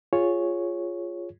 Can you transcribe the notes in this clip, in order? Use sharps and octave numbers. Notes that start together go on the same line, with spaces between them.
F4 G#4 C#5